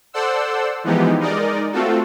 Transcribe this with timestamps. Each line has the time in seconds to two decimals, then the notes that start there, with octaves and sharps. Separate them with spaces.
0.13 A4 C5 D5 F#5 C6 E6
0.84 E3 F3 G#3 B3 D#4 G4
1.20 G#3 D#4 A#4 D5 D#5
1.72 A3 C4 F4 F#4 A4